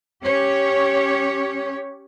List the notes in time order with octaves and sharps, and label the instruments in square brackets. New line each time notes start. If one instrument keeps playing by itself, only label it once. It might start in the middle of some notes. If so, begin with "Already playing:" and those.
[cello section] C#4 G4 C#5